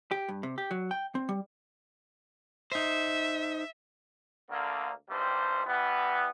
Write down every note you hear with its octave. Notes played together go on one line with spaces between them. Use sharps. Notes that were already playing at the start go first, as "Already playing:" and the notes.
G4
G2
C3
G4
F#3
G5
C4
G3
D#4 C5 E5
D2 D3 A#3
G#1 G2 C3 G3 C5
E3 G3 B3